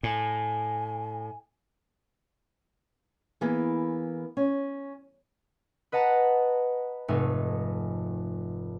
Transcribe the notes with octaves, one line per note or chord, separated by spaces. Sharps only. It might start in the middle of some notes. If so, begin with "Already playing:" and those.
A2 G#5
E3 A#3 B3 G#4 B4
C#4
B4 D#5 F#5 A5 A#5
F1 G#2 G#3 A3 D#4